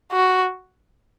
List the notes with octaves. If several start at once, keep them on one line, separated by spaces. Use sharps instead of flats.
F#4